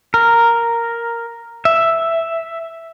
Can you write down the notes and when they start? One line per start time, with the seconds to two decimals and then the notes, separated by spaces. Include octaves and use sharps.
0.14 A#4
1.65 E5